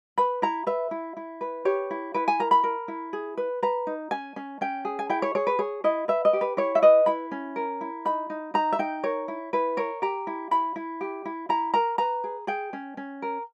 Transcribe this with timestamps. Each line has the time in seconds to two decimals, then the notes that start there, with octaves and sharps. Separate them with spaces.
0.18 B4 B5
0.42 E4 A#5
0.67 B4 E5
0.91 E4
1.17 E4
1.41 B4
1.65 G4 C#5
1.91 E4
2.14 E4 B4
2.28 G#5
2.40 A#4 A#5
2.51 B5
2.64 A#4
2.88 E4
3.13 G#4
3.37 B4
3.62 B4 A#5
3.87 D#4
4.11 C#4 G#5
4.36 C#4
4.61 C#4 G5
4.85 G#4
4.99 G#5
5.09 E4 G5
5.22 C#5
5.35 G#4 C#5
5.47 B4
5.59 G#4 C#5
5.84 E4 D#5
6.08 B4 E5
6.25 D#5
6.33 G4
6.41 B4
6.57 E4 C#5
6.75 E5
6.82 B4 D#5
7.06 E4 B5
7.31 C#4
7.56 A#4
7.81 E4
8.05 D#4 B5
8.30 D#4
8.54 D#4 A#5
8.72 E5
8.79 D#4 G5
9.03 A#4 C#5
9.28 E4
9.53 E4 B4
9.77 A#4 C#5
10.02 G4 A#5
10.27 E4
10.51 E4 B5
10.76 E4
11.01 G4
11.25 E4
11.49 E4 A#5
11.74 A#4 A#5
11.98 B4 A#5
12.24 G#4
12.47 G#4 G5
12.73 C#4
12.97 C#4
13.22 A#4